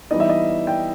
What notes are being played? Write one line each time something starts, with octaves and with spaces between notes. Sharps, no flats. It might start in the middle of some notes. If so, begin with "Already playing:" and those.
E3 G3 B3 D#4 D#5
E5
D#5
G5